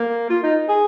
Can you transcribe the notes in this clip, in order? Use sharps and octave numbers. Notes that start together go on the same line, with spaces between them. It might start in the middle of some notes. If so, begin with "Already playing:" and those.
Already playing: A#3
F4
D#4
G#4